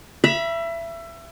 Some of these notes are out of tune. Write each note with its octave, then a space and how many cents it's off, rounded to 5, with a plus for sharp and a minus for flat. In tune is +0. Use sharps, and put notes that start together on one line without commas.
E5 +25 B5 -25